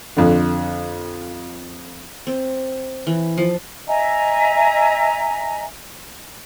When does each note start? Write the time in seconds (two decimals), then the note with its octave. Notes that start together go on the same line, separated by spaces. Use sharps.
0.17 F2 D3
2.27 C4
3.07 E3
3.38 F3
3.87 D#5 E5 G#5 A#5